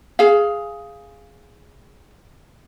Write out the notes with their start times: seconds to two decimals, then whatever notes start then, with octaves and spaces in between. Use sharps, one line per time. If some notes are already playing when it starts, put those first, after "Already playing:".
0.19 G#4 F5